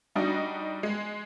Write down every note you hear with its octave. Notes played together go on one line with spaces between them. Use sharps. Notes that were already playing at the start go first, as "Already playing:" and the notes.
G3 D4 D#4 F#4 D#5
G#3